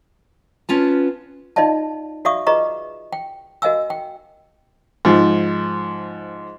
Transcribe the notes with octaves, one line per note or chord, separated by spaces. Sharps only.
B3 C#4 F4 A5
D#4 F4 D5 D#5 F5 A5
F#4 D5 E5 F5 C#6 D#6
F4 G#4 B4 D#5 A#5 C#6
G5
F#4 A#4 D#5 F5 G#5 E6
G5
G#2 F3